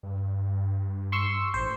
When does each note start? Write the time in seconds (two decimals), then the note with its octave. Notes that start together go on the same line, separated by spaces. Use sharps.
0.03 G2
1.12 C6 C#6 E6
1.54 A1 C5